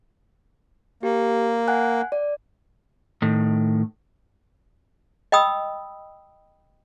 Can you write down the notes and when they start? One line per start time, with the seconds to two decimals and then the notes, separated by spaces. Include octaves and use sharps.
1.03 A#3 G4
1.68 F#5 G#5 F#6
2.12 D5
3.22 A2 D#3
5.32 D#5 G5 B5 D#6 E6